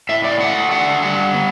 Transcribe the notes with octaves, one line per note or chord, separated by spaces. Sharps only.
A2 E5
D5
A3 F#5
D3 F#5
G3 F#5
B3